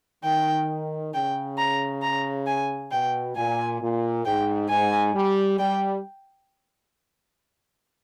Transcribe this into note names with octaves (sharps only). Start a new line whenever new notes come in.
D#3 G5
C#3 G5
A#5
A#5
G#5
B2 G5
A#2 G#5
A#2
G#2 G5
G#2 G#5
G3
G3 G5